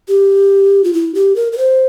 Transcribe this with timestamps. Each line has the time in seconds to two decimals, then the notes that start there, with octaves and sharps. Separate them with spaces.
0.08 G4
0.84 F4
0.93 E4
1.15 G4
1.36 A#4
1.52 A#4
1.58 C5